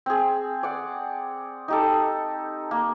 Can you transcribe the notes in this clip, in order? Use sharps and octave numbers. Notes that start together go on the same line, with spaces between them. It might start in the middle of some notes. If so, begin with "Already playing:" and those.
C4 G#4
D5 F#5
D#4 G4 A4
A#3